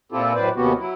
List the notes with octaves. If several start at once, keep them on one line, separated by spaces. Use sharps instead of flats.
A#2 C4 E4 F4 G4 A4
F#2 A2 B4 C5 D5
D#2 C3 B3 C#4 F#4 G4
F#3 E4